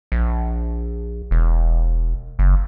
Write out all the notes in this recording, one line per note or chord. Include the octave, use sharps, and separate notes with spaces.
A#1
E1
F#1